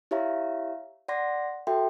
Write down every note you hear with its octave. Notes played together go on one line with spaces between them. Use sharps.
E4 G4 C#5 E5 F5 A#5
D5 F#5 C6 A#6
F#4 A4 E5 G5 C6